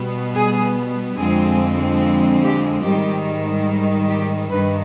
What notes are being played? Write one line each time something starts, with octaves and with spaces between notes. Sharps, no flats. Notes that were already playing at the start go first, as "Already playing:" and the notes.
Already playing: B2 G3 B3
G#4
F2 D3 F3 G#3 C4 G#4
G4
G#2 D#3 G3 G4
G4
G2 D#3 G3 B4